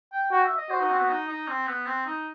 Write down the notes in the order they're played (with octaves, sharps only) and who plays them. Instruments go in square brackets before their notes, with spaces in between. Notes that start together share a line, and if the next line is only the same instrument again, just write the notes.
[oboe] G5
[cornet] F#4 [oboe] G5
[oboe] E5
D#5
[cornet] F#4 [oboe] C5
[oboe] D#4
C4
B3
D#4
D#4
C4
B3
C4
D#4